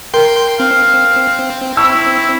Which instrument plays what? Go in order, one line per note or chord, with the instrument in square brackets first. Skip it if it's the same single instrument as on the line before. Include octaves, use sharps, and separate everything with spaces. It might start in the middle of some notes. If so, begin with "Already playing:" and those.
[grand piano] A#4 [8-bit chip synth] G5 C6 G6
[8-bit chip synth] C4 [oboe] F5
[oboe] E4 [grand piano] C#6 E6